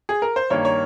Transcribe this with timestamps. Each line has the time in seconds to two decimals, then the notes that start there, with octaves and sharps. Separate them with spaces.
0.09 G#4
0.22 A#4
0.36 C5
0.50 G2 D#3 A#3 C#5
0.65 C#5